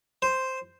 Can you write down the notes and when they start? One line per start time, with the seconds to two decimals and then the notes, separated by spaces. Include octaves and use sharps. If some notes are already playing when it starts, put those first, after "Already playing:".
0.22 C5